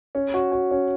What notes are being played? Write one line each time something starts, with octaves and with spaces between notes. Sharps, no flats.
C#4
F#4
F#4
C#4